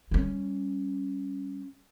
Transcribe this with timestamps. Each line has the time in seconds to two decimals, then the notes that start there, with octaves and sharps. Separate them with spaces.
0.11 G3 C#4